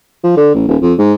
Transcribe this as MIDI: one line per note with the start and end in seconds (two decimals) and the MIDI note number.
0.24 0.34 53
0.37 0.51 50
0.55 0.66 33
0.68 0.77 27
0.82 0.93 41
0.98 1.13 44